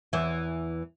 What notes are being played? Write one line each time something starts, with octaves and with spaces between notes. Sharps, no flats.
E2 E3